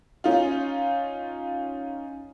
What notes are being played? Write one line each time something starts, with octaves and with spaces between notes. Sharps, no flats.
C#4 D#4 F4